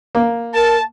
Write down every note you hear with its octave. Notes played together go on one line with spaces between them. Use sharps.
A#3
A#4 A5